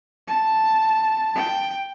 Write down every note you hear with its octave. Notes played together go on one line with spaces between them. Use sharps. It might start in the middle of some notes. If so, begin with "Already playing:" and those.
A5
G5